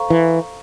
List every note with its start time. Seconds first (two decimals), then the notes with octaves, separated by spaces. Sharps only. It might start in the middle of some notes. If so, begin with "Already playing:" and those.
Already playing: A4 C5 F5 A#5 C#6
0.10 E3